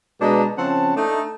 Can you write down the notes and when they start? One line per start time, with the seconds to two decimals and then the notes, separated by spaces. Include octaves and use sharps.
0.21 B2 G#3 D4 B4 D#5 A#5
0.58 C#3 F3 C4 F#5 A5
0.96 A3 D4 D#4